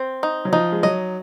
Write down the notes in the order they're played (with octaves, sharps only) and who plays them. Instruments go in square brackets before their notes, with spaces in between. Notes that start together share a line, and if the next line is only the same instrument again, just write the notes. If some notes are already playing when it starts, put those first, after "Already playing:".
Already playing: [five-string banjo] C4
D#4
[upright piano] F#3
[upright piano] F3 [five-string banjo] D#4
[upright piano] G#3
[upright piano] F#3 [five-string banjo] D#5